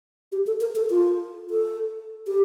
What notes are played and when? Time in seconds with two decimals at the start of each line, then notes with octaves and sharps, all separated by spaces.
0.32 G4
0.47 A4
0.61 A#4
0.76 A4
0.90 F4
1.50 A4
2.27 G4